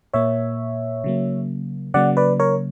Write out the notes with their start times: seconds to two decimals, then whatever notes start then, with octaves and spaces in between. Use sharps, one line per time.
0.13 A#2 A#3 C#5 E5
1.04 C#3 F#3 A#3
1.94 C#3 F#3 A#3 D5 F#5
2.17 B4 D5
2.40 A#4 C#5